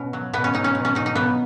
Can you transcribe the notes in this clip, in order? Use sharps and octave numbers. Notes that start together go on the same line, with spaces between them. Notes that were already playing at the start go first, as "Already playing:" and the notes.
Already playing: B2 C#4
F#3
B2 B3
C#4
F#3 D#4
C#4
B2
C#4
F#3 D#4
D#4
B2 B3